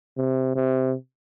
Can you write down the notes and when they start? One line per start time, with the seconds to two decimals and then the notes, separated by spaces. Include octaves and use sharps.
0.17 C3
0.55 C3